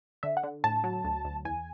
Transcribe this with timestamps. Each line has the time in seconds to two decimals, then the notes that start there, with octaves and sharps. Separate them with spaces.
0.23 D3 E5
0.37 F#5
0.43 D3
0.64 A2 A5
0.84 F#3
1.04 D2
1.25 D2
1.45 E2 G#5